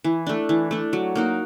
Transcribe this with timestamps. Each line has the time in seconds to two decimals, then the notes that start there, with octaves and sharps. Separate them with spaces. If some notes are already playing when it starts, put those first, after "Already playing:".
0.04 E3
0.26 A3 D4
0.49 E3
0.71 A3 D4
0.93 F#3
1.15 A#3 D#4 F#4